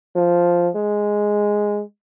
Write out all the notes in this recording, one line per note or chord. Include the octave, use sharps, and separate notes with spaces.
F3
G#3